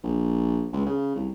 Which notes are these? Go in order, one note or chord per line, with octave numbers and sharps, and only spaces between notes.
A#1
C#2
C#3
C2